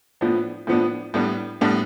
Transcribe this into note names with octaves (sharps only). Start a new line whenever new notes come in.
A2 F3 B3 D4
A2 F3 B3 D4
A2 G3 B3 D4
A2 G3 B3 D4